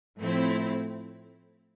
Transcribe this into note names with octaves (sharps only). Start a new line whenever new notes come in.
A2 F3 A3 C4 E4